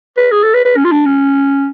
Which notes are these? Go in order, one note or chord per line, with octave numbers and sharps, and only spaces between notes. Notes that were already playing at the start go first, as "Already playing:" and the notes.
B4
G#4
A4
B4
B4
C#4
F4
D4
C#4